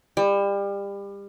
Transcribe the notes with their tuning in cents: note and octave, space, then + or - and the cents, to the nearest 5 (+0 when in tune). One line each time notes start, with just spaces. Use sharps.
G3 +30